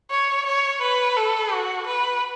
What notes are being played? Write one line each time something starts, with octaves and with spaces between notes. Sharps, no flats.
C#5
C#5
B4
A4
F#4
B4